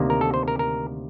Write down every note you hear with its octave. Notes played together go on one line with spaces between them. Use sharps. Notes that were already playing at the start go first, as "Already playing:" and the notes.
Already playing: D2 C3 D#3 A#3
A#4
A4
C5
A#4
A#4